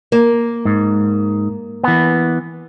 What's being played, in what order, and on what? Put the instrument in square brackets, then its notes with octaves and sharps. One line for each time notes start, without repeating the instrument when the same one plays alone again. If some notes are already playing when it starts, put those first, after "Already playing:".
[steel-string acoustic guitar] A#3
[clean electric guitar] G#2
E3 B3